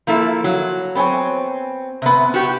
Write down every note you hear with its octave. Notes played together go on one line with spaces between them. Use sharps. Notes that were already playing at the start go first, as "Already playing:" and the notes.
F3 A#3 E4 A4
F#3
B3 C4 C#5 G#5
C3 B3
F#4 G4 G5